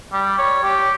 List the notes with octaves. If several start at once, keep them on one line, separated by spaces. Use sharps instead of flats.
G3
C#5
G4